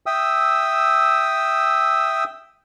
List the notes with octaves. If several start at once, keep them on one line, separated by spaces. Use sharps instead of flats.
E5 G5 D#6 E6